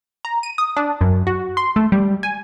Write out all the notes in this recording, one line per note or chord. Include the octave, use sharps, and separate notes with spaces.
A#5
D#7
D#6
D4
F#2
F#4
C6
A3
G3
G#5